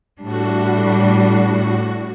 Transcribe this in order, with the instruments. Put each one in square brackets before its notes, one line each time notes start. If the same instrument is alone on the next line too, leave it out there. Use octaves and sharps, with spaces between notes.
[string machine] A2 F#4 [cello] G3 D4